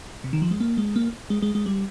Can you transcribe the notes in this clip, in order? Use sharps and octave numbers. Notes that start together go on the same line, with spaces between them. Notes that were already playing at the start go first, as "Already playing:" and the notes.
C3
D#3
F3
G#3
A#3
G#3
A#3
G#3
G#3
G#3
G3